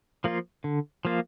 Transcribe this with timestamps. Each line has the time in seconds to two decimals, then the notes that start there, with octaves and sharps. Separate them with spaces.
0.24 F3 A#3 F4
0.64 D3
1.05 F3 A#3 F4